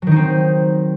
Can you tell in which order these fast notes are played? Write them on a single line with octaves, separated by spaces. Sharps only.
F#3 D#3 D#4 C4